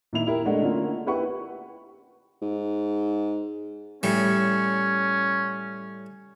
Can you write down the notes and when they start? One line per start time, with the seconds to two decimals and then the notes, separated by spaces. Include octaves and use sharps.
0.13 A#2 D#3 E4 F7
0.27 E4 G4 A#4
0.45 G#3 A3 D4 F#5
0.61 D3 A3 A#3 C#4 D4 F4
1.06 E4 G4 B4 F#5 C#6
2.42 G#2
4.03 A2 G3 C#4